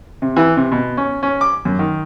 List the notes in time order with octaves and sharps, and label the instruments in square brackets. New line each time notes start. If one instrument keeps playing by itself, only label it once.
[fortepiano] C3
E3
C3
B2
C#4
C#4
D6
F#2
D#3